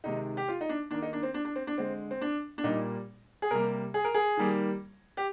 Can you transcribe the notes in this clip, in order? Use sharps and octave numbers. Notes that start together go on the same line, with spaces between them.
C3 D#3 G#3 D#4
G4
F4
D#4
D4
D#3 A#3 D4
D#4
D4
C4
D4
D4
C4
D4
D3 G#3 C4
C4
D4
D4
A#2 G3 A#3 D#4
G#4
C3 G3 A#3 A#4
G#4
A#4
G#4
D#3 G3 A#3
G4